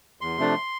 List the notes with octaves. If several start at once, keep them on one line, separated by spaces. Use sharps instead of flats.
E2 C6
C3 F3 A3 D4